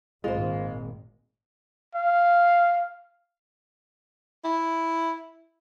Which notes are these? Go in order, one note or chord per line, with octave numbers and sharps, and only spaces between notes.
G#1 A#2 G#3 F4 C5
F5
E4